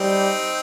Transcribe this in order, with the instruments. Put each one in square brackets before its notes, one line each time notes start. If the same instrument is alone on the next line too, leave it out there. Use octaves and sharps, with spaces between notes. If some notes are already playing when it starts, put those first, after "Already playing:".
Already playing: [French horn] G3 [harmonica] C4 D#4